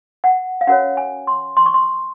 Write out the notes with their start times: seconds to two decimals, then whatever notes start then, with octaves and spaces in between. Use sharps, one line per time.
0.24 F#5
0.61 F5
0.67 C#4 F#4 A#4 C#5 F#5
0.97 G#5
1.27 C6
1.57 C6
1.66 C#6
1.74 C6